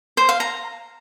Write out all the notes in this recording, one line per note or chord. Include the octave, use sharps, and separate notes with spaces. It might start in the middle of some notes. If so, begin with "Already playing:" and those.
C5
F5
A#5